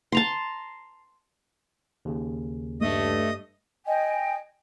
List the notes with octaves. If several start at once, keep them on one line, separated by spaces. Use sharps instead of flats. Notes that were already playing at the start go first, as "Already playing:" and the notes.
A5 A#5 C6
D#2 C#3
G2 A3 D#5 D#6
D#5 G5 G#5